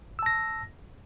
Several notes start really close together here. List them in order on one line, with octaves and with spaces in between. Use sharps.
E6 A5 A#6